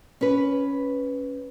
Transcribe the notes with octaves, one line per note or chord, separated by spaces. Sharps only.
C#4 B4